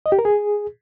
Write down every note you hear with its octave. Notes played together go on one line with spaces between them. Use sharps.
D#5
G4
A#4
G#4